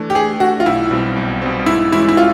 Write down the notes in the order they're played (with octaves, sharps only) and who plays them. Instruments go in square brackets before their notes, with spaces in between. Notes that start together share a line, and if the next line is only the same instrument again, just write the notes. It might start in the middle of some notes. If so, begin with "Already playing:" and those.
Already playing: [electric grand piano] E3 A3 D4
[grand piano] G4
[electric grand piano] E3 [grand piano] G#4
[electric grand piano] A3 D4 [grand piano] F#4
[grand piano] F4
[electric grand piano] B1 [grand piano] E4
[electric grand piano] B2 G3 C4
B1
B2 G3 C4
[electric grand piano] G#2 [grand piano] E4
[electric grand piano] E3 G#3 C#4 F#4 [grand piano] E4
[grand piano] E4
F4